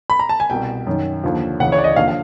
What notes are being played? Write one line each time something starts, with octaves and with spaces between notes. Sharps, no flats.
B5
A#5
A5
G#5
C2 B2 G5
F#2 D#3
D#2 D3 F3
D2 C#3 E3 F#5
C#5
D5
D#5
D#2 D3 F3 F5
F5